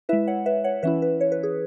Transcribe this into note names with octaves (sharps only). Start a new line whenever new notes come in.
G#3 E4 B4 E5
C#5 F#5
B4 E5
C#5 F#5
E3 C#4 E4 B4 E5
B4
C#5
B4
G#4